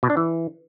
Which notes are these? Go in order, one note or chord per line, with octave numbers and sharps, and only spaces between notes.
B2
D4
E3